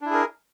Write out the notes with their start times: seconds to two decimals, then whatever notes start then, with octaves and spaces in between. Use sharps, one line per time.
0.01 D4
0.06 E4
0.10 G#4
0.14 A#4